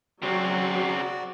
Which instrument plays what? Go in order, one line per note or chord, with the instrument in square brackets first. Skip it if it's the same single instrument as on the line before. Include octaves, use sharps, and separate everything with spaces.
[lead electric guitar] C#3 C4 [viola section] F#3 [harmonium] F#4 D5